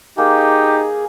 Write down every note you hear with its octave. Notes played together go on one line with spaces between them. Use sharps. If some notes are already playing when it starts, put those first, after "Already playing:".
A#3 D#4 G4 G#4